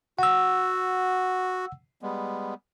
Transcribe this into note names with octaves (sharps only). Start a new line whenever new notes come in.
F#4 F#5 E6
G3 G#3 B3